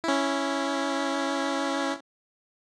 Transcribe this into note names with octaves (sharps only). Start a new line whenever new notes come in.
C#4 E4